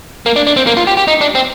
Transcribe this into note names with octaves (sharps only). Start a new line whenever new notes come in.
A#3
D4
D4
C4
A#3
F4
G4
G4
D#4
D4
C4